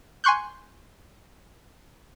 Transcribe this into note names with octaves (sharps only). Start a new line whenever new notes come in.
G#5 C6 C#6 F#6 G6